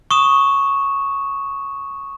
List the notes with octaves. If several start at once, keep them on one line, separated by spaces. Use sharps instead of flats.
C#6 D#6 E7